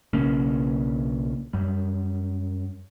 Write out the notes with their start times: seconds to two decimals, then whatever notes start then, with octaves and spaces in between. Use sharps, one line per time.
0.13 B1 C#3 A#3 C#4
1.53 F#2 G3